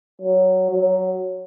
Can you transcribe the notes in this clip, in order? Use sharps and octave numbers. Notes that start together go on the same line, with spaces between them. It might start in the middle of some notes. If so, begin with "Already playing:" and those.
F#3
F#3